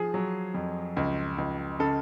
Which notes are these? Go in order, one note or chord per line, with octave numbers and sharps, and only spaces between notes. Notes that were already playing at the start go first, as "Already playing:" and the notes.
Already playing: F3 G#4
F#3
F2
C#2
C#2
C#3 A4